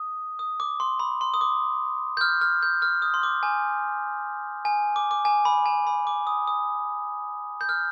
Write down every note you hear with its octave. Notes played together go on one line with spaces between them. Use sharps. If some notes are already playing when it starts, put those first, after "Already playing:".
Already playing: D#6
D#6
D6
C6
B5
C6
D#6
D6
G6
F6
F6
G6
F6
D#6
C6
D6
G#5
G#5
D6
D6
G#5
B5
G#5
B5
D6
D#6
D#6
G6
F6